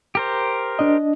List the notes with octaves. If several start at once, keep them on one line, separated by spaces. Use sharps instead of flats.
G4 A#4 C5
D4 D#5